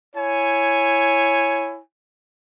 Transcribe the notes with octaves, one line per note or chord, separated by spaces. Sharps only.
E4 C#5 G#5